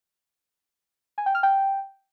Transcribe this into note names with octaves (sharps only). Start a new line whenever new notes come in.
G#5
G5
F6
G5